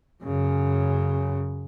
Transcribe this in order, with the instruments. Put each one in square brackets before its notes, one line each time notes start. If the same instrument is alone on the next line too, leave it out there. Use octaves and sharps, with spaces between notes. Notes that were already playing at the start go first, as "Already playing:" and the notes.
[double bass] F#2 C#3